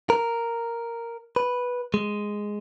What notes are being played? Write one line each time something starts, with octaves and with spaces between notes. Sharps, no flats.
A#4
B4
G#3